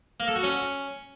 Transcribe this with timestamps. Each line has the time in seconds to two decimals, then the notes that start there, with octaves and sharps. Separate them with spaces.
0.20 A#3
0.28 A4
0.35 F#4
0.43 C#4